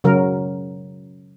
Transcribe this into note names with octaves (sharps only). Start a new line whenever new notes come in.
C#3 F#3 A#4